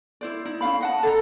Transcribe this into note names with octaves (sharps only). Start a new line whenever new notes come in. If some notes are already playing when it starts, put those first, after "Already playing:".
E4 C5 D5
D#4 E4
C#4 F#4 F5 B5
D#5 F#5 A5
A4 A#5